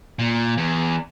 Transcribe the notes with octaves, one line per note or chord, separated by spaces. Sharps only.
A#2
E2